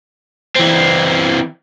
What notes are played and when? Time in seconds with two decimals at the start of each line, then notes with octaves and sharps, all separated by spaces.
0.55 E3 C4